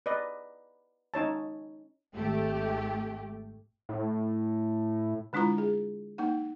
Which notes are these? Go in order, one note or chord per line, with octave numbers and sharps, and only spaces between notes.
B4 D5 D#5
C#4 D#4 C#5 A5
G#1 A3 G4
A2
D3 G#3 D4 E4 F4 A#5
G#4
A#3 D#4 F#5